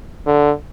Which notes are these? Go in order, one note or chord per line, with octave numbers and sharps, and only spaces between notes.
D3